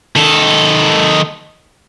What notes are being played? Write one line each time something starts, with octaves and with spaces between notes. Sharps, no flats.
D#3 A4